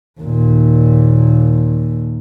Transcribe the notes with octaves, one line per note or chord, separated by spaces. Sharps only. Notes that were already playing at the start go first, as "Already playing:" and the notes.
D#2 A#2